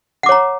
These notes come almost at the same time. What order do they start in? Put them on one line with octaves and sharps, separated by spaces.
F#5 D6 C#5 A#5